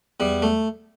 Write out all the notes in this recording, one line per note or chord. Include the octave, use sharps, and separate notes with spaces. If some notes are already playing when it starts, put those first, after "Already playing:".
E2 G3
A3